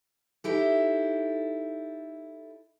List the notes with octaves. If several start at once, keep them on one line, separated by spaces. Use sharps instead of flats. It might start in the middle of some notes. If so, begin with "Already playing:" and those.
D#4 E4 G4 A4